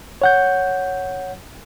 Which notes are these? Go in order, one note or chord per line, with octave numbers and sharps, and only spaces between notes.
C#5 F#5 G6